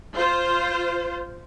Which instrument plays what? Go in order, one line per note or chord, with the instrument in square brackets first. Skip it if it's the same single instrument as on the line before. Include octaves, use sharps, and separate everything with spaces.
[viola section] F4 C5